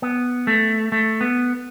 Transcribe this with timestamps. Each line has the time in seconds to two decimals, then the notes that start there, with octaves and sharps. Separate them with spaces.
0.02 B3
0.47 A3
0.92 A3
1.21 B3